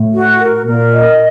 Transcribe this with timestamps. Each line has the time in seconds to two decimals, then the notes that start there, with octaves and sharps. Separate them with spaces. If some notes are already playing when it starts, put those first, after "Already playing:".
Already playing: A2
0.13 F#4
0.39 A#4
0.66 A#2 A#4
0.91 D#5